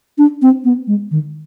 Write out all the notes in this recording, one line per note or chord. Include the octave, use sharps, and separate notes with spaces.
D4
C4
B3
G#3
D#3